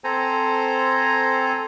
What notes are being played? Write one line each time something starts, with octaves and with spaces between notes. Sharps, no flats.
C4 A4 C5 G#5 A#5